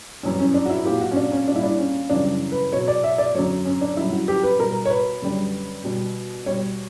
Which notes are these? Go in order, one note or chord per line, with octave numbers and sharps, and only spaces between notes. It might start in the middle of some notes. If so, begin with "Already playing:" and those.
F#2 E3 G3 C#4
C#4
D4
F#4
E4
A#2 F#3 G4
F#4
C#4
D4
C#4
A#2 G3 D4 E4
D4
C#4
F#2 C#3 E3 G3 D4
B4
B2 F#3 C#5
D5
E5
D5
F#2 D3 F#3 C#5
C#4
D4
F#2 D3 G3 E4
F#4
G4
B4
B2 G3 A#4
C#5
B4
F#2 D3 G3
B2 G3
B2 G3 C#5